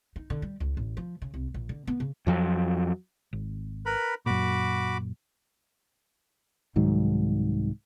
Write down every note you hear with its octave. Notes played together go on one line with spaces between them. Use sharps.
D#4
D3
G3
C#2
A1
F3
C#3
C2
A#1
D3
B3
C#3
F2 F3 F#3
G#1
A#4 B4 B5
F#2 A#2 F#4 B5 D6
C2 G#2 D#3 F#3